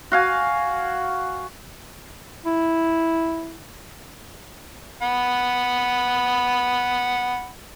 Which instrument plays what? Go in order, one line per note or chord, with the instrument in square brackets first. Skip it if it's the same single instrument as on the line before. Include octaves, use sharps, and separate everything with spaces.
[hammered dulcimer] F#4 F5 G#5
[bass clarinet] E4
[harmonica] F#5 B5